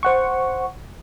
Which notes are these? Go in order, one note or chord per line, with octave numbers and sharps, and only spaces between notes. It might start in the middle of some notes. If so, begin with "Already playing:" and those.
C5 F#5 C#6